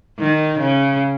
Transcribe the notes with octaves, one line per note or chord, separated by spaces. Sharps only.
D#3
C#3